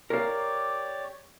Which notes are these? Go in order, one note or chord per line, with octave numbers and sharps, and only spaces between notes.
G4 A#4 C#5 D5 F5